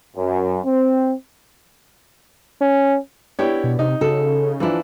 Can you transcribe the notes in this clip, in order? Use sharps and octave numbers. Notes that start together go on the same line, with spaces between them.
F#2
C4
C#4
B3 D4 E4 G4 C#5
B2
C3 D#4
C#3 F#4 A4
E3 F3 A#3 D4 E4